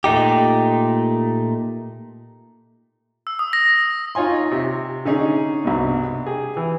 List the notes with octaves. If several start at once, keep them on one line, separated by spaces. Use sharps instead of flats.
A#2 A3 D#4 G4
E6
D#6
A#6
D#4 F4 C#5 G#5 C6
C3
D3 C#4 D#4 G#4
C2 G2 B2
G4 G#4
E3